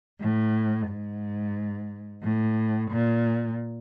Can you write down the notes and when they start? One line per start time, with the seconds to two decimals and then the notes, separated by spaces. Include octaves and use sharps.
0.19 A2
0.88 G#2
2.22 A2
2.91 A#2